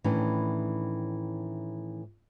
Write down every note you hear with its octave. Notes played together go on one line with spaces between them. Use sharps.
A2 D#3 E3 C#4 D4